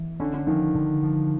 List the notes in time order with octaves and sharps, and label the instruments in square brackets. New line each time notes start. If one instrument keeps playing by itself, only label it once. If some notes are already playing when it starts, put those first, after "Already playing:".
Already playing: [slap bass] E3
[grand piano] D3 [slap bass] C#4
[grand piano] D3
[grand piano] D#3 [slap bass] F3
[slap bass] D3
F3